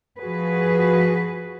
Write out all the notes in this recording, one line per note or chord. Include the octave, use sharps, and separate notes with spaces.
F3 F#4 G#4 B4